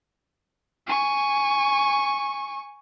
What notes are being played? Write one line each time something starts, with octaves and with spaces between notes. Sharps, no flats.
G#5 C#6